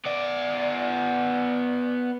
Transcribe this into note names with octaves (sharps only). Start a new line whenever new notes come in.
B3 D5